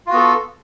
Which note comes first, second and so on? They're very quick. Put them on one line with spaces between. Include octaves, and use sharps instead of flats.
F4 F#4 B3 A4